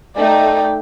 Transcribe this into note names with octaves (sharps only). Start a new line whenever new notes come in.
A3 D#4 D5 G5